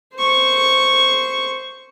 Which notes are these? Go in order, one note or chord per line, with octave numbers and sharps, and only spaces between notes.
C5 C#6